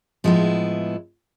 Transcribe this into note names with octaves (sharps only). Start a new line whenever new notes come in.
A2 F3 G#3 B3 E4